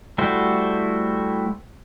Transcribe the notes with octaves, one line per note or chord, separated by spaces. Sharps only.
G3 A3 E4 F#4 C5